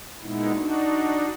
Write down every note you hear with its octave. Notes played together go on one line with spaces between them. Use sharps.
A#2 G#3 B3 D#4 E4
D4 D#4 F#4